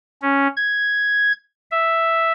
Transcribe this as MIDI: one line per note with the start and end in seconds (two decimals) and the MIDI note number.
0.22 0.48 61
0.57 1.32 92
1.71 2.32 76